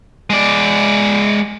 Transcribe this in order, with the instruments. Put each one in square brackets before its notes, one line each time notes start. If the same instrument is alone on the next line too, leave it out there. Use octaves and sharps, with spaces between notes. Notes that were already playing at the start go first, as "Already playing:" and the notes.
[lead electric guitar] G#3 D5